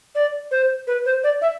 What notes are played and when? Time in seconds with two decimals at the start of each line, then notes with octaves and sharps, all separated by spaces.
0.15 D5
0.51 C5
0.87 B4
1.06 C5
1.24 D5
1.42 E5